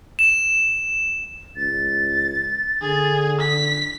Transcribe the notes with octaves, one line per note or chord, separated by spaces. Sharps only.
E7
C#2 A6
D3 G#4
B6